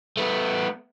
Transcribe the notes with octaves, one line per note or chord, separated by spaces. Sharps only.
A3 B3